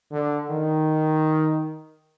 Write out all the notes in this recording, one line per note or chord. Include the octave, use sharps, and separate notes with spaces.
D3
D#3